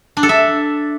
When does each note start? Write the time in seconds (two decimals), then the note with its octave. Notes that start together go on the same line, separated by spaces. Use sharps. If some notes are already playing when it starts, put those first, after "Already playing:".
0.17 D4
0.23 A4
0.29 E5